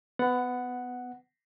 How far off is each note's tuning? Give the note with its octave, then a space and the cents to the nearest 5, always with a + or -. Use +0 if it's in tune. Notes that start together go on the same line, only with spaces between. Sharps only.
B3 +20 F#5 +0